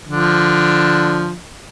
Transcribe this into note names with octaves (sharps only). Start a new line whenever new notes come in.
D3 F3 D4